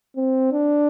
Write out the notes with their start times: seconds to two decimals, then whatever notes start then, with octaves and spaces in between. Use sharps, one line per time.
0.16 C4
0.52 D4